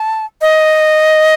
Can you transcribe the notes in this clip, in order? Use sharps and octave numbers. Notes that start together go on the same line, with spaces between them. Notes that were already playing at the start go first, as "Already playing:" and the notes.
Already playing: A5
D#5